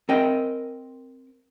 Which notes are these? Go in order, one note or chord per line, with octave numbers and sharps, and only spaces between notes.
C4 A#4 D#5 G5